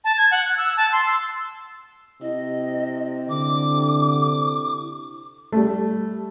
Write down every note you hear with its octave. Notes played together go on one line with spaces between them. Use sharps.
A5
G#6
F#5
F#6
E6
A5
C6
E6
C3 E4 D#5
D3 D6
G3 A3